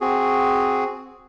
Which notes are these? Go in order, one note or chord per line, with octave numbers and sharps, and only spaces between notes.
C4 F#4 G#4